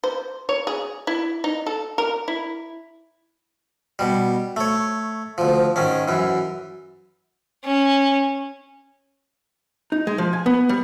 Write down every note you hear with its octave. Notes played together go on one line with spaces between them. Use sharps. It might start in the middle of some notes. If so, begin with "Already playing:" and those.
C5
C#5
G#4
E4
D#4
A4
A#4
E4
B2 G3
A3 C#5
D2 F3
G#2 D#3 C#4
F#2 E3
C#4
D#4
G#3
F3
G#5
B3
G3